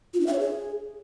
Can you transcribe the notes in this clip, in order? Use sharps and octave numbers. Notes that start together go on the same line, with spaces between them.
F4
D4
E5
C#5
G#4